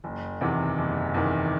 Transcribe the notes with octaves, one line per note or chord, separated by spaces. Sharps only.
F#1
E2 C3 D#3
F#1
E2 C3 D#3